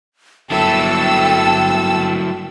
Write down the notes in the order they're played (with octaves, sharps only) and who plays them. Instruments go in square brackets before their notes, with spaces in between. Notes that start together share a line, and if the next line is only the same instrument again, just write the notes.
[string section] G1 A4 E6 [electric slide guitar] F#3 E4 [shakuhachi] G5